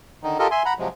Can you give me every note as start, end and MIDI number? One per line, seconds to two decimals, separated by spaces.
0.23 0.38 50
0.23 0.38 51
0.23 0.38 63
0.39 0.48 65
0.39 0.48 67
0.39 0.48 69
0.39 0.48 70
0.39 0.48 75
0.51 0.63 76
0.51 0.63 80
0.51 0.63 84
0.65 0.74 78
0.65 0.74 82
0.65 0.74 83
0.79 0.88 48
0.79 0.88 53
0.79 0.88 54
0.79 0.88 56